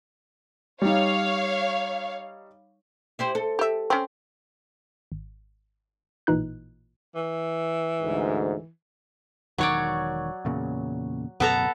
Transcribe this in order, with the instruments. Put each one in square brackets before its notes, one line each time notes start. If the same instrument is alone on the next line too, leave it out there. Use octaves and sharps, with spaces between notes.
[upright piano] G3 D#4 [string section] C#5 F5
[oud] E4 G4 C5
A4
[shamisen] G4 E5
C4 C#4
[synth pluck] G#1
A1 A#2 E3 D#4 F#6
[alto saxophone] E3
[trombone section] D2 G#2
[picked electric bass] E1 D#3 [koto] F#3 C#5 D5
[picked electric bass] E2 A#2 C#3
[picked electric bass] D1 F#2 B2 [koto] B3 A4 A#5